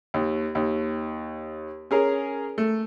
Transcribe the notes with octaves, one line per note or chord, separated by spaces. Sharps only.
D#2
D#2
C#4 G#4 A#4
A3